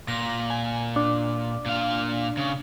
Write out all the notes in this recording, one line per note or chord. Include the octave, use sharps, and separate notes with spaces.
A#2 A#6
G#5
D4
A#2 F5
C#3